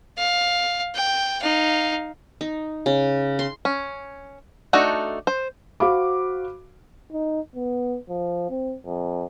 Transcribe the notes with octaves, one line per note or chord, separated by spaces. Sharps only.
F5
G5
D#4 F5
D#4
C#3
C6
C#4
A3 D4 D#4 F#4 A4
C5
F#4 C5 F5 B5 D6
D#4
B3
F3
C4
F2